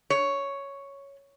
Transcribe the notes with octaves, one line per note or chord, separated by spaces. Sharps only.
C#5